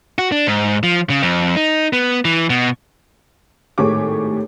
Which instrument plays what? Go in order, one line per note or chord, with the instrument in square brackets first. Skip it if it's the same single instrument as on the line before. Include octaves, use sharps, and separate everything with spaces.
[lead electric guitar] F#4
D4
G#2
F3
C#3
F2
D#4
B3
E3
B2
[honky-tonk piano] G#1 A2 G4 G#4 C#5 D6